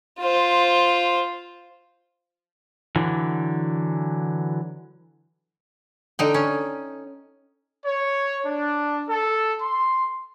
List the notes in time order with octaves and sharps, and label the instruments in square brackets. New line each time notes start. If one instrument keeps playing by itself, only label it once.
[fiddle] F4 C5
[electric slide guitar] D3 E3 F#3
[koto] D3 D#4 G5
C#4
[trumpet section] C#5
D4
A4
C6